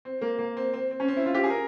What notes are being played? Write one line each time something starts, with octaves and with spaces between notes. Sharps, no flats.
C4
A#3
A#3
C4
C4
C4
C#4
C4
E4
F4
G4
G#4
A#4